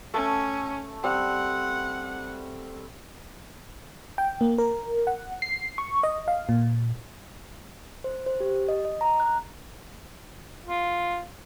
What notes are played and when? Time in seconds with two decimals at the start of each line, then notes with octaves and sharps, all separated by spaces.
0.14 A3 C#4
1.04 G3 C4 F#5
4.18 G5
4.41 A#3
4.58 A#4
5.07 F#5
5.42 C7
5.78 C#6
6.03 D#5
6.28 F5
6.49 A#2
8.04 C5
8.26 C5
8.40 G4
8.68 D#5
8.85 D#5
9.01 A#5
9.20 F#6
10.65 F4